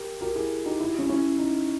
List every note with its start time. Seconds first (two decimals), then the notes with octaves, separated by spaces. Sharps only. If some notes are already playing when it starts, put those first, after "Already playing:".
Already playing: G4 A#4
0.21 G4 A#4
0.35 E4 G#4
0.66 D#4 G4
0.80 E4
0.89 G4
0.99 C#4 E4
1.09 C#4 E4
1.38 D#4